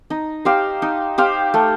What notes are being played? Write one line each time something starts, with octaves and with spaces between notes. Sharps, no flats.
D#4
G4 C5 F5
D#4
G4 C5 F5
A3